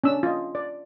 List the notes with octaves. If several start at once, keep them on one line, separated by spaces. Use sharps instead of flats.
C#4 D4 E6
F4 D#5
D5